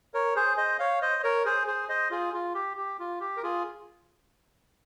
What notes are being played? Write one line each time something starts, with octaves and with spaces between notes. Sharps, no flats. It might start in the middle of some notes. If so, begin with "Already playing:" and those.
A#4 C#5
G#4 C5
C5 D#5
C#5 F5
C5 D#5
A#4 C#5
G#4 C5
G#4 C5
C5 D#5
F4 G#4
F4
G4
G4
F4
G4
A#4
F4 G#4